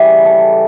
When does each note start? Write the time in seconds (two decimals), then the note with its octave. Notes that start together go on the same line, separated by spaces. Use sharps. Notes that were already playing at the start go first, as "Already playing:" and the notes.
Already playing: C#3 E3 G3 E4 G4
0.25 A4